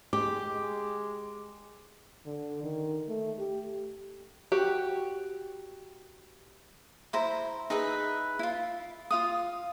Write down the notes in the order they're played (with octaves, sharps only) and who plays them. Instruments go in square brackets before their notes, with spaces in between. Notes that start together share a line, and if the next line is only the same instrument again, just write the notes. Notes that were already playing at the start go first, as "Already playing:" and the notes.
[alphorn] G#3 [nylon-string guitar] G4 [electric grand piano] D6
[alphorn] G#3
D3
D#3
A3
G4
[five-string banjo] F#4 G4
[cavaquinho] E4 C5 A#5
D#4 G#4 B4 E5
E4 F4
F4 F5 D#6